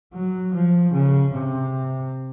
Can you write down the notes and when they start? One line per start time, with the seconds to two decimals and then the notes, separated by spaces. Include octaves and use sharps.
0.14 F#3
0.54 F3
0.93 C#3
1.33 C3